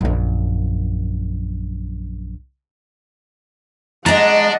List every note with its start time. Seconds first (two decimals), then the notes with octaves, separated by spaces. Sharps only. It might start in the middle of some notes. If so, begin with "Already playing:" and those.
0.01 A#1 F#2
4.06 G#3 D4 D#5 F#5 A#5